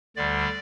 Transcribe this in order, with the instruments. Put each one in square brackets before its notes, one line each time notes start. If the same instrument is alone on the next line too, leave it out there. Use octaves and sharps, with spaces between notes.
[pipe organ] D2 D3 G3 D5